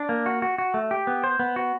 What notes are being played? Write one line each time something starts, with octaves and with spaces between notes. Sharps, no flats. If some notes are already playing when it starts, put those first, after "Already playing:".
Already playing: D4
A#3
F#4
F#4
F#4
A3
G4
B3
C5
B3
F#4